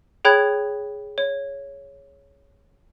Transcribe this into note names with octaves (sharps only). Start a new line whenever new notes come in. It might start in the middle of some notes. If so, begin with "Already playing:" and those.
G#4 C#5 G5 B5 F#6 G#6
C#5